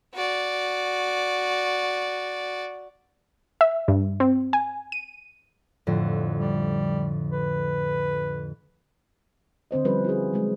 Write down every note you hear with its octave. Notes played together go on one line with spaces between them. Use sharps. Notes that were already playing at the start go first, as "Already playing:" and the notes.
F#4 D5
E5
G2
C4
G#5
D#7
F2 A2 D3
G3
B4
D3 C4 C5 D#5
F3 G3 C#4 E4 B4
E4 F#4 G#4
F#3 G#3